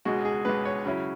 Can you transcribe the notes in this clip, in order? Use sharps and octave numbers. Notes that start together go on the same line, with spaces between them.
C#2 B2 G#3 F#4
G#4
C#2 B2 G#3 B4
C#5
C#3 F#3 C#4 E4